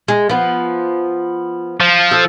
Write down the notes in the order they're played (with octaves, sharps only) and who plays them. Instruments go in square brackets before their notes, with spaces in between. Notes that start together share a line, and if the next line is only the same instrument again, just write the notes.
[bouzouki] G#3
F3 B3
[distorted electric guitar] F3
[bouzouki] A4